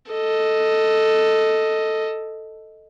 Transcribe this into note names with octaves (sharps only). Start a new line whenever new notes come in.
A4 D#5